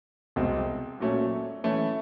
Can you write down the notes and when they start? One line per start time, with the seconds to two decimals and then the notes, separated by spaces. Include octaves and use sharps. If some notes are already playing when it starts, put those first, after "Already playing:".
0.36 C2 B2 G#3 C4
1.00 A#2 F#3 A3 C#4
1.64 E3 A3 C#4